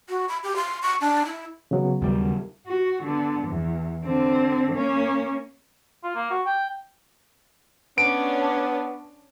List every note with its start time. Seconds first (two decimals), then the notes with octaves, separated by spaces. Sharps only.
0.09 F#4
0.29 B5
0.44 G4
0.56 C6
0.83 C#6
1.01 D4
1.26 E4
1.71 C#3 F#3 B3
2.02 D#2 G3
2.67 F#4
3.03 D3 B3
3.48 E2
4.04 D3 C4
4.72 A#3 C#4
6.03 F4
6.15 A#3
6.31 F#4
6.46 G5
7.98 B3 C#4 D4 D7